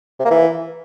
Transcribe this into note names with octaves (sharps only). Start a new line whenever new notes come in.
C3
A#3
E3